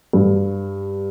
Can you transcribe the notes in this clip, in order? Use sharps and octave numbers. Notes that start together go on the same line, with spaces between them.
G2